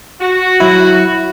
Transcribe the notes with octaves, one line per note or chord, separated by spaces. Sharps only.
F#4
F#3 E4